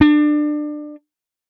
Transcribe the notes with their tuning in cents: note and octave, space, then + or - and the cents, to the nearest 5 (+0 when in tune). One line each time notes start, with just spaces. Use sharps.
D4 +25